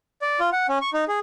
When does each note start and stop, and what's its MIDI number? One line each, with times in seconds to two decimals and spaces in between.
0.22 0.40 74
0.40 0.50 65
0.53 0.67 78
0.69 0.78 61
0.82 0.90 85
0.93 1.04 63
1.08 1.20 68